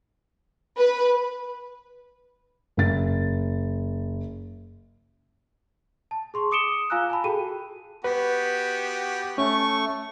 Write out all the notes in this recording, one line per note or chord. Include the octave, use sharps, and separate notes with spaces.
B4
F#1 A6
A5
G#4 C6 C#6
D6 D#6 C#7 D7 E7 G7
F4 F5 G#5 A#5 E6 F#6
G#5 A5 B5
F#4 G#4 A4 G5 D#7
B3 F#4 G4 B4
A3 C#4 C#6